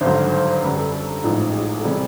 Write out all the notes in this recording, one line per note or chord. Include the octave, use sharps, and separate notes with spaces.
G#1 G2 D3 F#3 C5
C5
C5
F#2 D3 G3 B4
A4
A4
A1 G#2 F3 A3
G#4
A4
C3 E3 G3 G#4